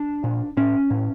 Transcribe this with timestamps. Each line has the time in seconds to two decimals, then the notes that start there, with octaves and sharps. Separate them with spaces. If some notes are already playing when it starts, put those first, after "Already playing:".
Already playing: D4
0.24 A#2
0.57 A2 C#4
0.91 A2